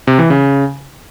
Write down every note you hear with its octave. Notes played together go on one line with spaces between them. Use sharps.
C3
E3
C#3